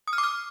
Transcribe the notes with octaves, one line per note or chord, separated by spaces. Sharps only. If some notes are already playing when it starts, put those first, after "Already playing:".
D#6
F6
D6
F6